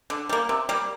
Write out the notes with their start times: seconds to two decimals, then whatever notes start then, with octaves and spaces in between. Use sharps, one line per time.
0.10 D3
0.29 G3 A#3
0.49 C3
0.69 G3 A#3